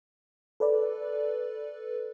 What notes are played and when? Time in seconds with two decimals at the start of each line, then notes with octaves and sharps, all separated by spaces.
0.60 A4 B4 D5